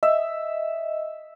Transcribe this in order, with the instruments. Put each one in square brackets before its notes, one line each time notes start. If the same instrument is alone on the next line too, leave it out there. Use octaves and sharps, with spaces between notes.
[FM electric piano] D#5 [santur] E5